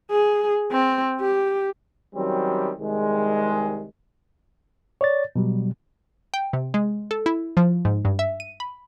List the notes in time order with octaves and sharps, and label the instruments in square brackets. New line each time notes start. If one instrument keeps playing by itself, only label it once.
[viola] G#4
C4
G4
[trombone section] D#3 F#3 G3 C4 C#4
C2 D#3 G#3
[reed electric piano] C#5 D5 A6
B2 F#3 G3
[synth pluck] G5
C3
G#3
A4
E4
F3
G#2
G2
E5
D#7
B5